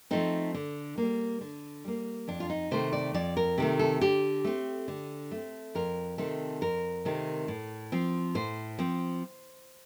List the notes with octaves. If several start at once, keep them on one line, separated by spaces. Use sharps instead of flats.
F3 A3 C4 D#4
D3
G3 A#3
D3
G3 A#3
F2 D4
F4
D#4
C3 D#3 A3 C5
D5
F2 D5
A#4
C3 D#3 A3
A4
D3 G4
A3 C4
D3
A3 C4
F2 A#4
C3 D#3 A3 C4 A4
F2 A#4
C3 D#3 A3 C4
A2
F3 C4
A2 C5
F3 C4